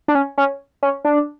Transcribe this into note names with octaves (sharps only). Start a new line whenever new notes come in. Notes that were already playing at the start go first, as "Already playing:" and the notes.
D4
C#4
C#4
C#4
D4